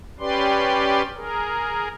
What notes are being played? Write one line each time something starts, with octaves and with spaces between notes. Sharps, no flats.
C#4 G4 B4 D5 C6
G#4 A#4